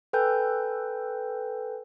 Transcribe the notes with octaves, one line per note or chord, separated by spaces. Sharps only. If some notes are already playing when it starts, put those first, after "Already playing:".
A4 B4 G5 G#5 G6